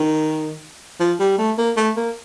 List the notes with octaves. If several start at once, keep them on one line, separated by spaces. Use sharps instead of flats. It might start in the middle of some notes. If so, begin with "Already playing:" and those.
Already playing: D#3
F3
G3
A3
A#3
A3
A#3